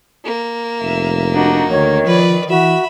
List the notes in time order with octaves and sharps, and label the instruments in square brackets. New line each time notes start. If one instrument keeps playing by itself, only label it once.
[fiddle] A#3
[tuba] F1 [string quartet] E5
[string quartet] D4 D#4 F#4
[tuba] D2 [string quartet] D#3 [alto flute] C#5
[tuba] F3 [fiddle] B4 D5
[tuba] E3 [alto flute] F#4 [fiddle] E5 B5